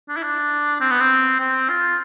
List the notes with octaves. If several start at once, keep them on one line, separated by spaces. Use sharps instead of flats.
D4
E4
D4
C4
B3
C4
C4
F4